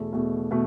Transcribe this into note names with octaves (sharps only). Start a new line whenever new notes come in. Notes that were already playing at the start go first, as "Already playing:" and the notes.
Already playing: E2 B2 A3
E2 B2 A3
B2 A3